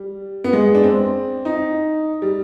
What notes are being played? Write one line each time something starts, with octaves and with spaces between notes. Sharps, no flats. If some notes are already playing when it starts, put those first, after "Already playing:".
Already playing: G3
B3
G#3
D4
C4
D#4
G3